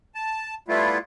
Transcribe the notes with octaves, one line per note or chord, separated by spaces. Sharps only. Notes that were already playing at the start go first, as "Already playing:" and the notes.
A5
G3 A3 B3 E4 F4